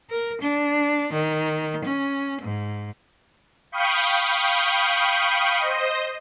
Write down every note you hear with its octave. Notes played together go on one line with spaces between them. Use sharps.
A#4
D4
D#3
C#4
G#2
F5 G5 B5 C#6 D#6 G6
C5 D#5